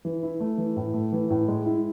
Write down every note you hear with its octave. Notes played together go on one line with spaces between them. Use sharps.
E3
E4
A3
E3
A2
A3
E3
A2
G#3
E4